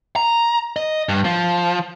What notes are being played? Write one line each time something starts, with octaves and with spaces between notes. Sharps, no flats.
A#5
D#5
G2
F3